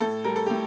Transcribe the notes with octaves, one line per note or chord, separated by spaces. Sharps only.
A2 A4
G3 A#4
A4
A2 G4